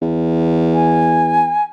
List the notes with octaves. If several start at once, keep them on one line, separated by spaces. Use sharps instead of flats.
E2
G#5